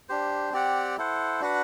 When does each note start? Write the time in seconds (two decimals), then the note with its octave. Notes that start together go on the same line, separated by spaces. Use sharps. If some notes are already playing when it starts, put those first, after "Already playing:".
0.09 D4 G4 C5
0.52 C4 G4 D5 F#5
0.97 E4 A4 C5 F#5
1.41 D4 F#4 B4 F#5